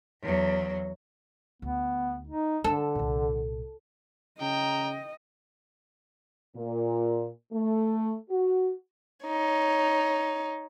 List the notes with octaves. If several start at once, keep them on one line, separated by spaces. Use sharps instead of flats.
E2 F#3
D2 B3
D#4
D3 D4 A4
C2 A#2
C#3 D#5 G5 A#5
A#2
A3
F#4
D#4 C#5